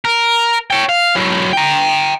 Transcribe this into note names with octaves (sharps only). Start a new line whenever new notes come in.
A#4
C#5 G5
F5
F#3 E4
G5 A#5